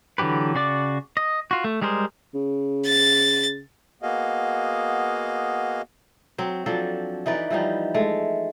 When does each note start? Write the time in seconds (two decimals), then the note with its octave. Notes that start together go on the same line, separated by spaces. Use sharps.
0.18 D3 E3 F#3 G4 B4
0.55 C#3 F#4 D5 D6
1.17 D#5
1.51 F4 F#4
1.64 A3
1.81 G3 G#3 G#4 A#4 C5
2.34 C#3
2.86 A6
4.02 A#3 B3 F#4 G#4 D#5 F5
6.38 F#3 C4
6.66 F3 F#3 D4 A4
7.26 E3 D#4 B4 D5
7.50 E3 F3 G3 D#4
7.94 G#3 A3